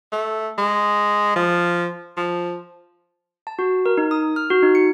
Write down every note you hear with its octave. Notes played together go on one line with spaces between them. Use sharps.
A3
G#3
F3
F3
A5
F#4
A#4
D#4
D#6
F6
F#4
D#4
C#7